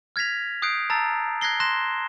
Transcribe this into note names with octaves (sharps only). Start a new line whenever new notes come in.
F6 G#6 A#6 B6 F7
D#6 F#6 G6 C7 D7
A5 A#5 E6 A6
F#6 G#6 A#6 C7 G7
C6 F#6 A#6 E7